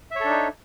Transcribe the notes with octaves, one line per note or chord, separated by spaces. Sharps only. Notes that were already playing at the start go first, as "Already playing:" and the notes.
D4 D#4 A4 C#5 E5